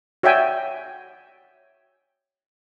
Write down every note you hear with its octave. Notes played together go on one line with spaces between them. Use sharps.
F#4 C#5 D5 E5 G5 G#5